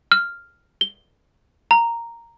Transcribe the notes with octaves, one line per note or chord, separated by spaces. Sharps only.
F6
G7
A#5